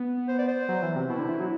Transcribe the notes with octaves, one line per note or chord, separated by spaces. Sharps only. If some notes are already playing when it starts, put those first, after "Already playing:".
Already playing: B3
C5
D5
C5
F#3
E3
C3
B2 E4
D3
E3
F#3